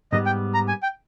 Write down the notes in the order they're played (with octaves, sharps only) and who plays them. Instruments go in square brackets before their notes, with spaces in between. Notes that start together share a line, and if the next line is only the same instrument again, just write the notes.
[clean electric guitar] G#2 G3 B3 [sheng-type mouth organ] D#5
[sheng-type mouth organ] G5
A#5
G#5
G5